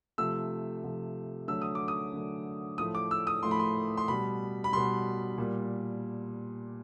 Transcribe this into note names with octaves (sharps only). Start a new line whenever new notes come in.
C3 F3 A3 E6
C3 F3 A3
D3 F#3 A3 E6
D#6
D6
D#6
D3 F#3 A3
A2 F3 A3 D#6
D6
E6
D#6
A2 F3 A3 C6
B5
C6
C6
B2 G3 B5
B5
B2 G3 C6
A#2 G3